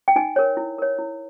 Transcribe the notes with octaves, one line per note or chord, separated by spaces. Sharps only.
G5
D#4 G#5
A#4 C#5
E4
A#4 C#5
E4